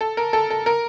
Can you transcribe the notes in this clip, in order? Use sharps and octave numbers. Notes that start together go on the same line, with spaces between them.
A4
A#4
A4
A4
A#4